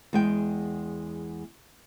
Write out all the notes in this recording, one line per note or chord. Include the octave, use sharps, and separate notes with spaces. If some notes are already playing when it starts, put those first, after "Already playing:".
E2 G#3 G5